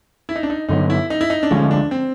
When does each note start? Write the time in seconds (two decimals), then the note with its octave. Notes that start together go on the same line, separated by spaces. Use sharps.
0.29 E4
0.36 D#4
0.43 D4
0.50 D#4
0.69 G2 D3 F#3 B3 D#4
0.90 E4
1.10 D#4
1.21 E4
1.30 D#4
1.43 D4
1.51 D2 D3 F3 G#3 C#4
1.71 D4
1.91 C4